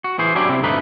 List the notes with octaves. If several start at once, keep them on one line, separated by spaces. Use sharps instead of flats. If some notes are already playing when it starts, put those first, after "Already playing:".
F#4
E3 G#4 C5
F#3 C#4 D4 E4 G4
C3 C4 E4
D2 G2 A3 D#4 B4 B5